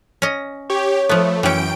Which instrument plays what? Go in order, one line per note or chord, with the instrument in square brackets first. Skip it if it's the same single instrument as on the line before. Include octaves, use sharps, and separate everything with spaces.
[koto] C#4 D#5
[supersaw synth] G4 [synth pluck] C#5
[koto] F3 B3 [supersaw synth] A3
[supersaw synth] F#2 G5 D7 [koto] E3 C#4